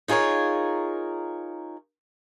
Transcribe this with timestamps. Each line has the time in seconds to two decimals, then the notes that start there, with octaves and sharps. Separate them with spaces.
0.08 D#4 F4 G#4 A#4 C#5